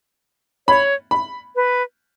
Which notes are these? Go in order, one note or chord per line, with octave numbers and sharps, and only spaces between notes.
C#5 B5
B5
B4